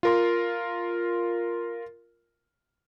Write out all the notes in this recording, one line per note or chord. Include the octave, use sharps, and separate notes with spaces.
F4 A#4 C6